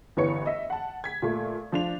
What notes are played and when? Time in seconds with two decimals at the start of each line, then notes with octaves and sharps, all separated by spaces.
0.17 G1 E3 B3 C#5 C#7
0.46 D#5 E5
0.70 F#5 A5
1.04 G#6 B6
1.22 A#2 A3
1.72 F3 D4 F7